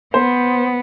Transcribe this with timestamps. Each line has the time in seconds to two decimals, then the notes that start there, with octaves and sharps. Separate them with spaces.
0.14 B3 C5